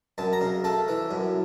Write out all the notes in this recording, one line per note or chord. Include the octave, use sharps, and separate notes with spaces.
F#2 A5
A#5
C#3
A3 A5
E3
F#2